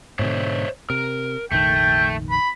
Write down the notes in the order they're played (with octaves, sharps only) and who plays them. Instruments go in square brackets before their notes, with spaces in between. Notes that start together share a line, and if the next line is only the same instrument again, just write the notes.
[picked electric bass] G#2 B2 D3 [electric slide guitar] C5 C#5 E5
[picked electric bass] C3 [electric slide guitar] A#4
[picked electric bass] F1 A#1 D#3 [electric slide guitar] A3 [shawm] G5
[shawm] B5